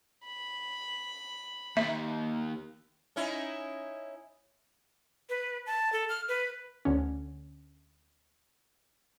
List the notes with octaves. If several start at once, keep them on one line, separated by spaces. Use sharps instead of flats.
B5
D#2 A#3 E5
C#4 D#4 E4
B4
A5
A4
F6
B4
D2 D3 C#4